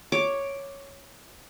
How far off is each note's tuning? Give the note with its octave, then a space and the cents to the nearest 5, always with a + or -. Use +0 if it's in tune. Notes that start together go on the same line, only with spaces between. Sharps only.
C#5 +0 D6 +0